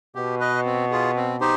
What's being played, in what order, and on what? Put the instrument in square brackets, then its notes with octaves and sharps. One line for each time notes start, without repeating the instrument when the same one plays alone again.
[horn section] B2 [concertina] G4
[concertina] B4 D#5
C4
F4 G#4
C4
D#4 G4 C5